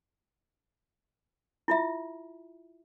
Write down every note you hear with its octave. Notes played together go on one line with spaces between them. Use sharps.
E4 F4 E5